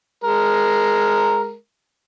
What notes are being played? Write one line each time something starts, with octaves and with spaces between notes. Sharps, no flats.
G#3 A#4